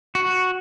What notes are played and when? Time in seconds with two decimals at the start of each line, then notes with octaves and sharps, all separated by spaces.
0.15 F#4